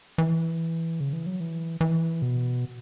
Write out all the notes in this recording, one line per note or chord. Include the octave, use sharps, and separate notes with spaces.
E3
C#3
E3
F#3
E3
E3
B2